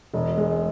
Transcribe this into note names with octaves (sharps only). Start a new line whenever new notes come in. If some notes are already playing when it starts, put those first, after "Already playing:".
E1
G#3